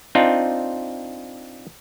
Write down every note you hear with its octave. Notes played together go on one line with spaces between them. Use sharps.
C4 D4 D#4 F4